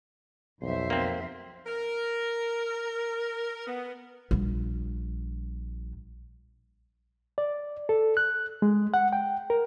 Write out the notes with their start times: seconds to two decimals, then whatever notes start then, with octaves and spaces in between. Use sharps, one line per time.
0.62 B1 F2 C5 E5
0.90 A#3 C4
1.65 A#4
3.67 B3
4.31 A#1 G3
7.38 D5
7.89 A4
8.17 F#6
8.62 G#3
8.94 F#5
9.13 G5
9.50 A#4